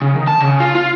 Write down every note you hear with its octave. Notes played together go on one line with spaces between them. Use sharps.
C#3
D#3
A5
C#3
F4
F4